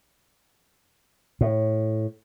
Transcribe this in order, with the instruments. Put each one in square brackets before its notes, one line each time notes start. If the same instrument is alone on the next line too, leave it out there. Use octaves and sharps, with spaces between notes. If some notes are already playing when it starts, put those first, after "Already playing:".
[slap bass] A2